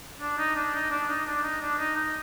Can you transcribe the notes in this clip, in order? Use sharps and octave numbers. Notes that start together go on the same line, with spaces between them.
D4
D#4
D4
D#4
D4
D#4
D4
D#4
D4
D#4
D#4